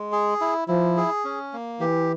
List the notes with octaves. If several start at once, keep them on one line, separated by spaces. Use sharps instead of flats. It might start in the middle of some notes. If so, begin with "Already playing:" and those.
Already playing: G#3
G#4
E4
F3 E4
G#4
C#4
A#3
E3 G4